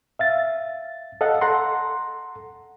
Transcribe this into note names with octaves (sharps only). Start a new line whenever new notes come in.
E5 F5 A6
A4 D#5 F5 F#5
A4 F#5 A#5 C6